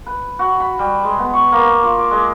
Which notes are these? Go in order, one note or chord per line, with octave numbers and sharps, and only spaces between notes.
B4
F#4
B5
G3
G#3
B3
C#6
A#3
F4
D5
G#3